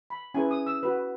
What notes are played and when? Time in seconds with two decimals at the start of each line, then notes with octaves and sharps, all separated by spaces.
0.10 B5
0.34 C#4 E4 G#4 B4 G#5
0.51 D#6
0.67 E6
0.83 F#4 B4